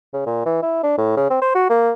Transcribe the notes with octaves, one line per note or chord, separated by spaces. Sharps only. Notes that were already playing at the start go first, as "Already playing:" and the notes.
C#3
A#2
E3
E4
D4
A2
C#3
C4
C5
F#4
A#3